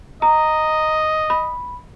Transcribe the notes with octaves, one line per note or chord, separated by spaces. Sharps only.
D#5 A#5
B5